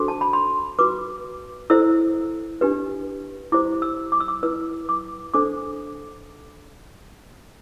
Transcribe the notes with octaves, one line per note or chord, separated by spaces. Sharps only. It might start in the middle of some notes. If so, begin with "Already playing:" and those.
Already playing: D4 F#4 A4 C5 D6
A5
B5
C6
F#4 B4 D6
E4 A4 C5 E6
D4 G4 B4
E4 G4 C5 D6
E6
D6
E6
D6
E4 B4 E6
D6
D4 A4 C5 D6